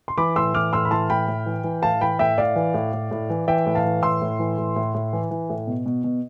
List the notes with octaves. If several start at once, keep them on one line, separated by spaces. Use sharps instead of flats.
C6
E3 B5 D6
A2 C6 E6
E3 D6 F6
A2 C6 E6
B5
E3 A5 C6
A2 G5 B5
A2
E3
E3
A2 F5 A5
E3 G5 B5
A2 E5 G5
A2 D5 F5
E3
A2
A2
A2
E3
E3 E5 G5
A2
F5 A5
E3
A2 C6 E6
A2
E3
A2
A2
A2
E3
E3
A2
B2
B2
B2